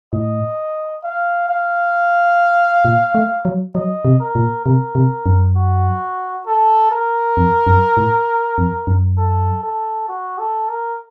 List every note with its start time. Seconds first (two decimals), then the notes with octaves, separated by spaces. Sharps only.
0.13 A2 D#5
1.03 F5
1.49 F5
2.85 A#2
3.15 A3
3.45 F#3
3.75 F#3 D#5
4.05 C3
4.20 A#4
4.35 A#2
4.65 C3 A#4
4.95 C3
5.26 F#2
5.56 F#4
6.46 A4
6.92 A#4
7.37 F2
7.67 F#2
7.97 A2
8.58 F2
8.87 F#2
9.17 A4
9.63 A4
10.08 F#4
10.39 A4
10.69 A#4